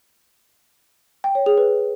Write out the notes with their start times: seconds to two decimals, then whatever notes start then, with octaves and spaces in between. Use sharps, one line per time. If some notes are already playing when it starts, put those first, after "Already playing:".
1.24 G5
1.35 C#5
1.46 G#4
1.58 B4